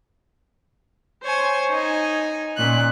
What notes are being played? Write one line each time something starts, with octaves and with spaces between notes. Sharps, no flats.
C5 C#5 G#5
D#4 G#5
A#2 C#4 F#6